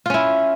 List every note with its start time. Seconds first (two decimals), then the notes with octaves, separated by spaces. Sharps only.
0.06 F4
0.10 C#4
0.14 E4